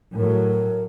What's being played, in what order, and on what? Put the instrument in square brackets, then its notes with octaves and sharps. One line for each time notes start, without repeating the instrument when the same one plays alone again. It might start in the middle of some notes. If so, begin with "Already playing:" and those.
[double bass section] A2 F#3 [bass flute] A#4